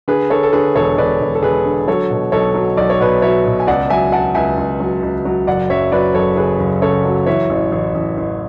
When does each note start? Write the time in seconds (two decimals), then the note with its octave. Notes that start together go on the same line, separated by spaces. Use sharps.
0.08 D3 G#4 B4
0.30 D3 A4 C#5
0.43 A4
0.52 D3 G#4 B4
0.75 E1 A4 C#5
0.98 E1 B4 D5
1.21 E1
1.35 A4
1.43 E1 G#4 B4
1.65 D3
1.88 F#3 A4 C#5
2.10 B2
2.32 B1 A4 C#5
2.55 F#3
2.77 B1 D5
2.90 C#5
3.01 B2 B4 D5
3.22 F#3 C#5 E5
3.46 B2
3.60 G#5
3.67 C#2 D5 F#5
3.89 F#3 E5 G#5
4.12 F#3 F#5 A5
4.35 C#2 E5 G#5
4.58 C#2
4.80 F#3
5.03 C#2
5.25 F#3
5.47 F#1 D5 F#5
5.70 F#2 C#5 E5
5.92 F#3 B4 D5
6.14 F#1 A4 C#5
6.37 C#3 G#4 B4
6.59 F#1
6.82 C#3 A4 C#5
7.05 F#3
7.26 E3 C#5 E5
7.50 A1
7.72 A1
7.95 A1
8.17 A1